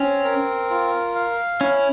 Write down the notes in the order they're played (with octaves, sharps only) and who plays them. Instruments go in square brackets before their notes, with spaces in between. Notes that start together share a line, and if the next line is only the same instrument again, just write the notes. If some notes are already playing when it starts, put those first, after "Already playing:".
Already playing: [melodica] C4 [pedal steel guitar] C#4
[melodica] A#4
F4
F5
[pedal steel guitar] C#4 [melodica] E4